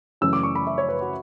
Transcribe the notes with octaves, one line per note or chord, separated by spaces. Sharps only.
F#2 C#3 E3 A3 C#4 E6
D6
C#6
B5
E5
C#5
B4
F#4